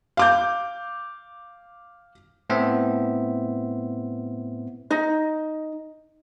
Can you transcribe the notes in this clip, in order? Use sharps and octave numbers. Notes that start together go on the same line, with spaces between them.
F5 D6 G6
A2 B3 C4 C5 E5
D#4 D#5